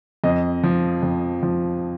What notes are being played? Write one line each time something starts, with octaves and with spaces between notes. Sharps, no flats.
F2 D#5
F3
F2
F3